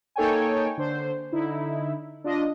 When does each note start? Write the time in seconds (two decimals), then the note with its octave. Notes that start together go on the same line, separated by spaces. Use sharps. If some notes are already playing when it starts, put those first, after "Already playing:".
0.16 A#3 D#4 A4 C#5 G5 G#5
0.77 D3 C5
1.32 D3 D#4 E4
2.24 D4 F4 D#5